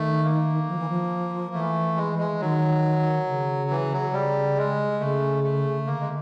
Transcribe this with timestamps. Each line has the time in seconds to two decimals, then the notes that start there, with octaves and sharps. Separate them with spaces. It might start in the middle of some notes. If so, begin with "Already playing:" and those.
Already playing: D#3 A3
0.24 A#3
0.68 F3
0.78 E3
0.89 F3
1.54 E3 A3
1.97 G#3
2.18 G#3
2.40 D#3 F#3
3.28 C#3
3.70 E3
3.93 F#3
4.13 C#3 G3
4.57 G#3
5.00 C#3 A3
5.44 A3
5.87 D3 A#3
6.01 G#3